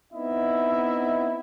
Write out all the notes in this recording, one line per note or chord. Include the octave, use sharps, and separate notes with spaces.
B3 C4 D#4 E4 D#5 E5